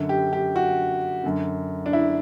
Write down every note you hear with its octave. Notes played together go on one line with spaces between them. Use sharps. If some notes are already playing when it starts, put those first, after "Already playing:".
Already playing: F#2 D3
G4
G4
F#4
F#2 D3
D4
E4